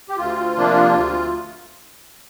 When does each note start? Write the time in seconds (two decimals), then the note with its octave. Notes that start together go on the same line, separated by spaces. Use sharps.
0.09 G4
0.17 D2 F4
0.56 C3 F3 A#3 D4
0.94 D2